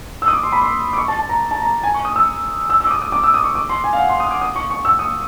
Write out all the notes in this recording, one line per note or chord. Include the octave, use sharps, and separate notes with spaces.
E6
D#6
D6
C6
B5
C6
D6
C#6
A5
A5
A#5
A5
A#5
G#5
C#6
D#6
E6
E6
E6
D6
D#6
D#6
D6
E6
D#6
C#6
D6
C6
G#5
F5
F#5
C6
D#6
D6
D#6
C#6
C#6
E6
D#6